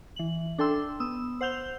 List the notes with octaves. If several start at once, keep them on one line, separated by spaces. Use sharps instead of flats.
E3 F#7
D4 A4 G5 C6 E6
B3 D#6 E6
C5 F#5 E6 G6 F7 G7